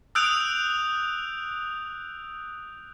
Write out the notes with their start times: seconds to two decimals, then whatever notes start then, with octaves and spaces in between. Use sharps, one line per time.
0.15 D#6 E6 F#6 G6 D7 F7